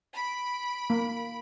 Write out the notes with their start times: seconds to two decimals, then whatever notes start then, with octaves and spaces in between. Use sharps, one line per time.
0.13 B5 D7
0.90 A#3